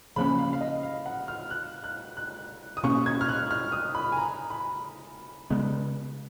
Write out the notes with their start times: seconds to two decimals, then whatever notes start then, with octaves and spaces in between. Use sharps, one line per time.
0.16 C#3 F3 A#3 C#4 B5
0.39 F5
0.53 F5
0.61 D#5
0.83 F5
1.06 F#5
1.28 F6
1.50 F#6
1.84 F#6
2.17 F#6
2.77 D#6
2.83 B2 A#3 C#4 C#6
3.06 G#6
3.21 F6
3.29 F#6
3.51 F6
3.72 D#6
3.95 B5
4.12 G#5
4.17 A#5
4.50 B5
5.50 C#3 G#3 B3